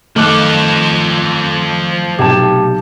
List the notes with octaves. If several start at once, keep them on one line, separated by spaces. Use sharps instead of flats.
D#3 F3 A3 A4 D6 F#6
B1 C3 G4 G5 A5